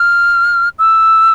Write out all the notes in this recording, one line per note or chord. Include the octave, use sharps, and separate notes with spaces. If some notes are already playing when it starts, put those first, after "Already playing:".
Already playing: F6
E6